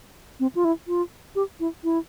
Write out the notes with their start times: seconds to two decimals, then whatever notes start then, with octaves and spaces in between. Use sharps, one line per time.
0.40 C4
0.55 F4
0.65 E4
0.88 F4
1.35 G4
1.60 E4
1.84 E4